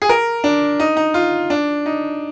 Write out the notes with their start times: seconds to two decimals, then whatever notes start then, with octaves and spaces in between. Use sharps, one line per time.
0.02 G#4
0.09 A#4
0.44 D4
0.80 D#4
0.97 D#4
1.14 F4
1.50 D4
1.86 D#4